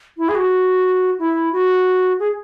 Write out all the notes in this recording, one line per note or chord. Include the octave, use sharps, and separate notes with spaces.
E4
G#4
F#4
E4
F#4
G#4